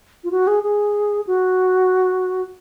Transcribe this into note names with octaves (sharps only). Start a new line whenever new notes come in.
F4
F#4
G#4
G#4
F#4